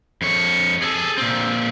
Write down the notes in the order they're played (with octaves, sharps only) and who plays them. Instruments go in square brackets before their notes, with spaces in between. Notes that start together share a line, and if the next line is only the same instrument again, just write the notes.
[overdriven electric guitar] F2 C#5
G#4 A4
A#2 C4